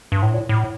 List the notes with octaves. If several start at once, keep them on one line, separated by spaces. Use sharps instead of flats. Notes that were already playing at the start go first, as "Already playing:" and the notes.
G2
A2
A#2
A2